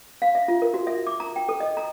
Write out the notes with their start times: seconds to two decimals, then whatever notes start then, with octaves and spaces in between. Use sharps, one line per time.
0.22 F5
0.35 E5
0.48 F4
0.62 A#4
0.74 F#4
0.87 E5
1.07 D6
1.20 A#5
1.36 G5
1.49 A4
1.60 D#5
1.77 A#5